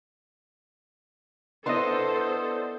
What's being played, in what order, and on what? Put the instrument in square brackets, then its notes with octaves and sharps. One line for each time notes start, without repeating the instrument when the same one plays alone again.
[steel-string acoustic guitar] B3 D4 E4 [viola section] A4 C5 [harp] D#5 C6